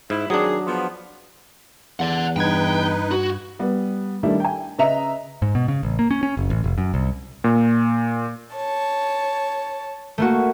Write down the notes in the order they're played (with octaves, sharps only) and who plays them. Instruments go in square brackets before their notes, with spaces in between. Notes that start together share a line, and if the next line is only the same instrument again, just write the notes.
[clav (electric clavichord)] G#2 [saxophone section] E4
[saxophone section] D#3 C4 G#4 [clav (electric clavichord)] F#3 D4
[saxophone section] F3 B3
[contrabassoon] E2 [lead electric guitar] D5 F#5
[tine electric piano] G2 G#6 [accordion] D#4 B4 [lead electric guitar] G5
[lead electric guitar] F#4
[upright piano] G3 B3
D#3 G3 A3 D4 E4 G4
G5 G#5
C#3 B4 D#5 E5 A#5 F7
[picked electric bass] G#2
B2
C#3
A1
A#3
C#4
C#4
F#1
A1
F1
F#2
C2
[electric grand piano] A#2
[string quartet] C#5 A5
[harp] A3 A#3 F#4